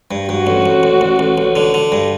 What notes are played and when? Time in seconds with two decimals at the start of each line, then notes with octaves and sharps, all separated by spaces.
0.11 G2
0.29 G2 F#4
0.47 A1
0.66 A1
0.83 A1
1.01 A1
1.19 A1
1.38 A1
1.56 D3
1.74 D3
1.92 G2